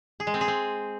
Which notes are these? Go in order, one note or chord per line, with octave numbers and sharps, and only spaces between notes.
G#4
G#3
C4
G#4
C4